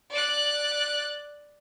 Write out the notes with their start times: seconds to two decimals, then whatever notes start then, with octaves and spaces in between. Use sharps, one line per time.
0.10 D5 F#6